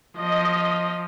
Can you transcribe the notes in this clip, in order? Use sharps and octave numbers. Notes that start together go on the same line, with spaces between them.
F3 D#5